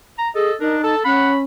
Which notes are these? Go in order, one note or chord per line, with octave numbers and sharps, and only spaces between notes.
A#5
G#4 A4 D#5
D4 D#4 A#4
A4 A5
C#4 F#5 B5